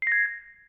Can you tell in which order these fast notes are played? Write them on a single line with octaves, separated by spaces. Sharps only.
C7 A#6 G#6